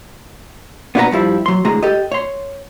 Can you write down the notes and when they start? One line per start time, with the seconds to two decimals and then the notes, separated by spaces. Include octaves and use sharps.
0.95 B3 D4 E4 F#4 B4 A#5
1.11 G2 F3 G3 E4
1.46 F#3 C6
1.65 A2 D3 G#3 G#4 A#5
1.83 G4 A4 D#5
2.12 C#5 C6